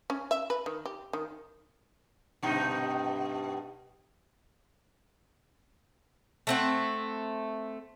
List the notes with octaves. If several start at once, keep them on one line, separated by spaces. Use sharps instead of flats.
C#4
E5
B4
D#3
G4
D#3
G2 B2 D#4
A3 C4 F#5